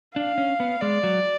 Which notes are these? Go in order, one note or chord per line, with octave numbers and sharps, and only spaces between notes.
D4 F5
C#4
B3
G#3 D5
F#3